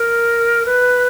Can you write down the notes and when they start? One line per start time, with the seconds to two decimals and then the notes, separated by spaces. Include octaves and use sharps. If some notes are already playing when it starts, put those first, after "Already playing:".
Already playing: A#4
0.65 B4